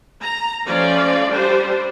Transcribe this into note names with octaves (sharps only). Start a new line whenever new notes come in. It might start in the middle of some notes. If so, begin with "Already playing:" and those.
A#5
F3 A3 C#4 F4 D5
G3 D4 G4 C5